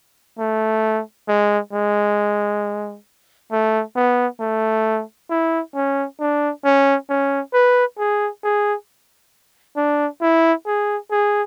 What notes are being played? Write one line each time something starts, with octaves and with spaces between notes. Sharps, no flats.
A3
G#3
G#3
A3
B3
A3
E4
C#4
D4
C#4
C#4
B4
G#4
G#4
D4
E4
G#4
G#4